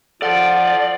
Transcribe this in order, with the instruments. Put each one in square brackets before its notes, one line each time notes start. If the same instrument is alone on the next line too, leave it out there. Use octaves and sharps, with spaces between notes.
[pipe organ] F3 [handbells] A4 F#5 [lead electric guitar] D5